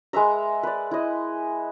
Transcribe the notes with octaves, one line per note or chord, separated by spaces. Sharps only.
G#3 B4 E5 A#5
B4 D5
E4 D#5